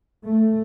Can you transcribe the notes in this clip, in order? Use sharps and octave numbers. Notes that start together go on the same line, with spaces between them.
A3